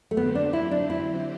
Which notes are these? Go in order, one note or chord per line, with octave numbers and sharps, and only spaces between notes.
A3
D3 F#3 B3 C4 G4 C5
D4
E4
D4
E4